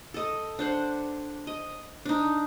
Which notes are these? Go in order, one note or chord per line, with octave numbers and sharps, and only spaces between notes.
A4 D#5
D4 C5 F#5
D#5
D4 D#4